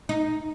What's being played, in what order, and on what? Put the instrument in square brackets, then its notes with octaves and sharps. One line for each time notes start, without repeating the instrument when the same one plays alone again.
[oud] D#4